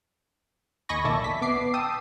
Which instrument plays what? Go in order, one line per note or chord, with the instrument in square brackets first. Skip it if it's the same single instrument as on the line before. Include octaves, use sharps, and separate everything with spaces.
[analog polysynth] D#2 D#5 G#5 B5 C#6 A#6
B1 A#2 D#3 D5 E5 A5
B6
B3 D6 C7
G5 A5 D#6 E6